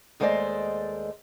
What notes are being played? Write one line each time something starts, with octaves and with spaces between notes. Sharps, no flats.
D#2 G#3 A3 C5 D5 D#5